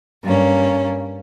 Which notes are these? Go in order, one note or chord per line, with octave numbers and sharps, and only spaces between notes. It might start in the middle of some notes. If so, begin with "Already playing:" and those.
G2 A#3 C#4